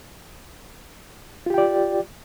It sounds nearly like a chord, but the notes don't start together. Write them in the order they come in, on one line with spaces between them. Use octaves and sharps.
F4 G4 G5 D5